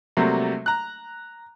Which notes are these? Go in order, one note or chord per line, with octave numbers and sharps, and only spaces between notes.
C3 F#3 G3 A3 A#3
A#5 F#6